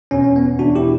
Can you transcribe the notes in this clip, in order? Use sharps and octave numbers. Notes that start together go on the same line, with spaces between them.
E2 B2 C#4
C#4
B3
E2 B2 D4 F#4
E4 G4